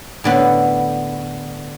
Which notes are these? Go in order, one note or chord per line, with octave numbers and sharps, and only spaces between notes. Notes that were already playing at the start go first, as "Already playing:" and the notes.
A2 D3 B3